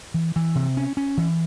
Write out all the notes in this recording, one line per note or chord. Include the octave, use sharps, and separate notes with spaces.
E3
E3
C3
C#4
C#4
E3